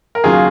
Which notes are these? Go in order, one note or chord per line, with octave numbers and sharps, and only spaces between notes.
A#4
D#2 C#3 F#3 F4 G#4